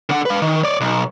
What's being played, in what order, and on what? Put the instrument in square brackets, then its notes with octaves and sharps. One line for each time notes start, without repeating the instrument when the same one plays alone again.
[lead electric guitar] D3 F#5
B4 F5
D#3
C#5 D5
B1